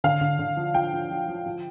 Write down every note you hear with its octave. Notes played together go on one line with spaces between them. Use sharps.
D3 F5
D3
D3
F3
F3 G5
F3
F3
F3
F3